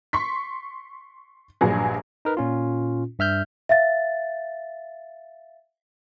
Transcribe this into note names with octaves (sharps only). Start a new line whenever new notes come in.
C6 C#6 B6
A#1 G2 F#3 G#4
D#4 A#4 B4
A#2 C#4 F4
G2 E5 F6 G6
E5 F5 A6